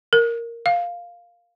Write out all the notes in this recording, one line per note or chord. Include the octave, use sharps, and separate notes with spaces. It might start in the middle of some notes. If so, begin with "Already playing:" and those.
A#4
F5